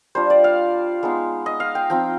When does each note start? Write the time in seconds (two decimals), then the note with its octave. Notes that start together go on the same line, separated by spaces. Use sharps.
0.15 G3 D4 F4 C5
0.30 D5
0.44 F5
1.03 G#3 B3 D#4
1.46 D#5
1.60 F5
1.75 G5
1.90 F3 C4 D#4 G5